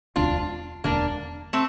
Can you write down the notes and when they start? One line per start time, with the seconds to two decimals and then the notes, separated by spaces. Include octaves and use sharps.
0.16 E1 D2 D3 D4 F4
0.84 E1 D2 D3 A#3 D4
1.53 A3 C4